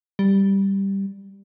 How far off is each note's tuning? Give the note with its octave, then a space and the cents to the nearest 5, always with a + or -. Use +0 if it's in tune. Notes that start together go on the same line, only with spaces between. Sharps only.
G3 +0